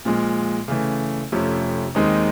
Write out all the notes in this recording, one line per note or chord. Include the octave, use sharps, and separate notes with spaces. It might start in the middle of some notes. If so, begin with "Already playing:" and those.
A#2 F3 G#3
C#3 E3 A3
F2 C3 F3 A3 C#4
D#2 D#3 G#3 C4 D#4